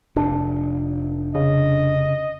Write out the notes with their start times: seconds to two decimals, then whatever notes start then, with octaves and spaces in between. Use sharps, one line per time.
0.16 F1 D4
1.35 C#3 D#5